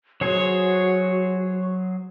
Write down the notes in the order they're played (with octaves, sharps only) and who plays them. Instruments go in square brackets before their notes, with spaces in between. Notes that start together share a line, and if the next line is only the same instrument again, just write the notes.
[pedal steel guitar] F#3 G#4 C5 [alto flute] F#4 [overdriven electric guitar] C#5